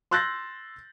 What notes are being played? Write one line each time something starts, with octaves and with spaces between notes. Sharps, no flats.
C6 E6 F#6 G6 A6 A#6